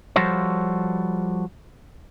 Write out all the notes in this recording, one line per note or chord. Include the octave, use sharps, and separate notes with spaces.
F3 G3 F#4 A4 C5 C#5